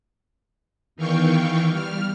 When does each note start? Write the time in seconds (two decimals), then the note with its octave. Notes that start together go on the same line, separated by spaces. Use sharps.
0.96 E2 D#3 E3 F5 G5 C#6
1.71 G3 F6